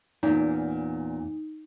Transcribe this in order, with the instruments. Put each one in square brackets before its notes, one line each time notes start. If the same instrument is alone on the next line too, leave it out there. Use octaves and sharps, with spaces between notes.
[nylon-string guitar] E2 A#2 C#4 [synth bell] D#4